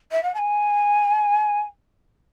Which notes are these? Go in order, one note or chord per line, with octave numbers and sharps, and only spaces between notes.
E5
F#5
A5
G#5